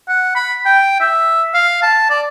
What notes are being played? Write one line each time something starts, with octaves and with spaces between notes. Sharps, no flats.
F#5
B5
G5
E5
F5
A5
D5